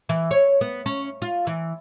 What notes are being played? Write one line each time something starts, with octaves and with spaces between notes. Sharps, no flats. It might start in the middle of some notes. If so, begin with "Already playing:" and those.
E3
C#5
B3
C#4
F4
E3